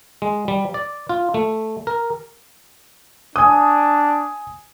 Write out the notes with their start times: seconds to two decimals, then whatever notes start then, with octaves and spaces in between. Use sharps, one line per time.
0.22 G#3
0.48 G3
0.74 D5
1.09 F4
1.34 A3
1.87 A#4
3.36 D4 G#5 D#6